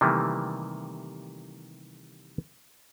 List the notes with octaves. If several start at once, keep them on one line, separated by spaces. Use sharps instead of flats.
C3 D#3 E3 G3 A3 A#3